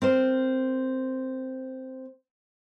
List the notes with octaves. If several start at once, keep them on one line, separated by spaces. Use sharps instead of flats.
C4 A#4 C5